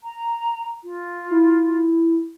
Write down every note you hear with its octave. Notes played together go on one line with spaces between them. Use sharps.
A#5
F4
E4